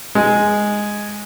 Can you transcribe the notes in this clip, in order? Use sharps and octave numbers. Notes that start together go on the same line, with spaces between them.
G#3